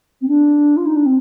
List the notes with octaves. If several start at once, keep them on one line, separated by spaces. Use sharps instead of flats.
C4
D4
F4
D#4
D4
C4